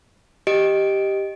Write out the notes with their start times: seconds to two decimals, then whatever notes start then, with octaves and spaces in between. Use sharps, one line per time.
0.47 G4 D#5 D7